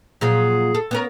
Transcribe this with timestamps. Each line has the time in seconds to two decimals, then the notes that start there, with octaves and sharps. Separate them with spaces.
0.21 A#2 F3 F#3 G#4
0.75 A4
0.91 B3 C#4 A#4